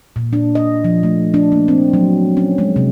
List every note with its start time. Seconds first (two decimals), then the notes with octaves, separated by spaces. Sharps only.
0.16 A#2
0.33 D4
0.55 D#5
0.84 F3
1.03 A3
1.34 D4
1.52 A#3
1.68 C4
1.93 F#3
2.37 C#4
2.58 G#3
2.76 C3